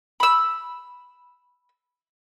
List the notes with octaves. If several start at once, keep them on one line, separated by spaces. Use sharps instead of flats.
B5 E6